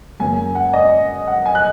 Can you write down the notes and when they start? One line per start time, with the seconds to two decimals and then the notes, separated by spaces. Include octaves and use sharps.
0.20 F#2 C#3 A#3 G#5
0.55 F#5
0.73 D#5
1.27 F#5
1.46 G#5
1.55 F#6